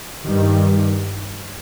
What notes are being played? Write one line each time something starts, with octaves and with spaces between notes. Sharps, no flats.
G2 D#3 G3